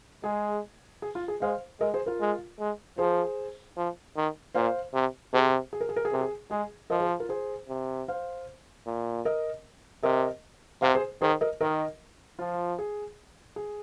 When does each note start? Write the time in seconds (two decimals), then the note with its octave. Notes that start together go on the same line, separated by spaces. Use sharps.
0.24 G#3 G#4
1.02 G#4
1.15 F4
1.28 G#4
1.41 G#3 C5 F5
1.80 G#3 A#4 D#5
1.94 G#4 C5
2.06 F4 A#4
2.21 G#3
2.59 G#3
2.98 F3 G#4 C5
3.77 F3
4.16 D#3
4.54 A#2 C5 F5
4.94 C3
5.33 C3 G#4 C5
5.73 G#4
5.81 A#4
5.89 G#4
5.96 A#4
6.05 G#4
6.12 C3 A#4
6.21 G#4
6.51 G#3 G#4
6.90 F3 A#4 D#5
7.00 G#4 C5
7.20 F4 A#4
7.29 G#4 C5
7.68 C3
8.08 C5 F5
8.86 A#2
9.25 A#4 D#5
10.03 C3 A#4 D#5
10.82 C3 C5 F5
10.95 G#4 C5
11.22 D#3 G#4 C5
11.41 A#4 D#5
11.61 D#3 A#4 D#5
12.39 F3 F4
12.79 G#4
13.56 G#4